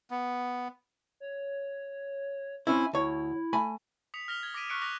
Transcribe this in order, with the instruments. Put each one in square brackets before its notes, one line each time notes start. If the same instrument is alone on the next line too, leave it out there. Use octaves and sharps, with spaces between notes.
[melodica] B3
[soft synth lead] C#5
[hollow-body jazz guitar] C4 C#4 E4 [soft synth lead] G#5
[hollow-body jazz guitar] D2 C#5 [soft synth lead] E4
[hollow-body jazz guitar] A3 G#5 B5
[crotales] D#6 B6 C#7 F7
F6 A#6 F7 G7
G#6 G7
D6 A#6 B6 D7 D#7
C#6 F6 F#6 B6 C#7 D7
D6 D#6 F#6 A#6 F7